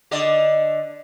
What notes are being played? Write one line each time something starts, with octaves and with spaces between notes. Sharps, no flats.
D3 D5 D#5